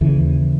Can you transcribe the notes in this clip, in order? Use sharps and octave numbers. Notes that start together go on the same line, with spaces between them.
D#2 C#3 E3